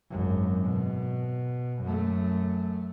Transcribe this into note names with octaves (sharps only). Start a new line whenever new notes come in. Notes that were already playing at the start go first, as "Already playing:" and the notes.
G#1 F#2
B2
F#2 A3